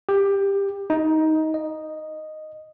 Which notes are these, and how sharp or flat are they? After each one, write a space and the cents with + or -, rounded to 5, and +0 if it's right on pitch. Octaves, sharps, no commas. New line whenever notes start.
G4 +15
D#4 +15
D#5 -5